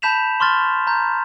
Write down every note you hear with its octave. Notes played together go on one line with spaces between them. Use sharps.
A5 B5 G6 B6 E7 F7
C6 C#6 F6 A6
A#5 G6